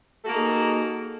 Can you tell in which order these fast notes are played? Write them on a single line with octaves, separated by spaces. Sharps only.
A4 F#4 A#3 D#4 G#4